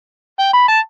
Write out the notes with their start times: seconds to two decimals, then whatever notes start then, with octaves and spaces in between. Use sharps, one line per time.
0.39 G5
0.53 B5
0.68 A5